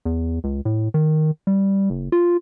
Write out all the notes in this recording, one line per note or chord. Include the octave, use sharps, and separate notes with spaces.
E2
C#2
A2
D#3
G3
F#1
F4